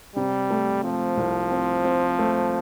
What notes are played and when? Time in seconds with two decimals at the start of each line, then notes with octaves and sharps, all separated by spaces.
0.16 C3 G3
0.50 A3
0.84 F3 C4
1.17 C2
1.51 C4
1.84 C4
2.19 A3